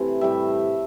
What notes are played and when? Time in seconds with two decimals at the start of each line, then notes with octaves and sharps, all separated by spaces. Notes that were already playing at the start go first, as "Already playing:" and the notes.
Already playing: C3 E3 A3 C5
0.21 A2 G3 E5